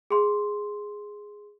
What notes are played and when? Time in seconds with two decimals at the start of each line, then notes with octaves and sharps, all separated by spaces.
0.11 G#4 C6